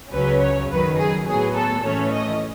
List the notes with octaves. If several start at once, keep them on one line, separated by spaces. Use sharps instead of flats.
C#2 C#3 F#3 C#4 B4
C#5
F#2 D#3 F#3 B4
G#4
A2 F#3 B3 G#4
A4
A2 E3 A3 C#4 C#5
D#5